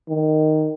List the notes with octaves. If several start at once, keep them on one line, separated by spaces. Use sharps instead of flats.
D#3